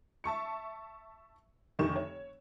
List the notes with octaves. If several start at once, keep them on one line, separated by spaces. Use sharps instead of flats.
E5 A5 C#6 C#7
F1 D3 D#3 G4 C#6 E7
C#5